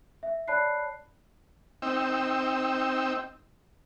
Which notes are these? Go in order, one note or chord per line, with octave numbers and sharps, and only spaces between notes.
E5
C#5 D5 A5 B5 F#6 C7
C4 D#4 G5 E6